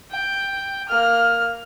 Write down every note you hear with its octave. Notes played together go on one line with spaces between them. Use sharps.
G5
A#3 F6